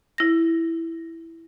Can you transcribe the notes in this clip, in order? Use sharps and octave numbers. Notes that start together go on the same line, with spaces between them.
E4 A#6